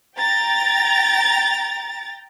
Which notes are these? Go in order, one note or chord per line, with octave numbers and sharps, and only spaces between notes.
G5 A#5 A6